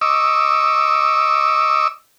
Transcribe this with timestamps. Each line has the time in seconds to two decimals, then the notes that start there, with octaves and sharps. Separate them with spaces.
0.01 D#5 C#6 D6 E6